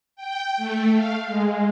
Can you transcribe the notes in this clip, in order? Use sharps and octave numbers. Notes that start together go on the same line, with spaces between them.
G5
A3
F5
G#3